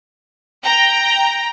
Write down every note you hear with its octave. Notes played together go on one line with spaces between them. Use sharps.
G5 A#5